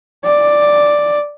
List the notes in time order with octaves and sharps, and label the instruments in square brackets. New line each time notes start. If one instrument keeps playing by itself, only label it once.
[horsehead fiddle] D5